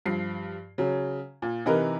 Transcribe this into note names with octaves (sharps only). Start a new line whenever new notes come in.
G2 F3 C7
C#3 F#3
A#2
C3 E3 D#4 A#4 B4